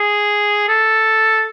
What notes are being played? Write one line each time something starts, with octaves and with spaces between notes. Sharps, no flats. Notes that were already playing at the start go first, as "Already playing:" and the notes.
Already playing: G#4
A4